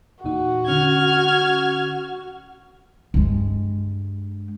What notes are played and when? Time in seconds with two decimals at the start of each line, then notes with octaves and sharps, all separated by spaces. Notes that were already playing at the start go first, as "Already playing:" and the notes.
0.24 E2 A#2 D#4 F#4
0.66 D3 C#4 F#5 F6 G#6
3.14 G2 G#3